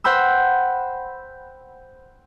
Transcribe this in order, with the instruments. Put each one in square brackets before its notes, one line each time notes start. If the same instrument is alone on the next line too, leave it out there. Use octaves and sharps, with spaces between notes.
[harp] C5 F#5 G5 B5 E6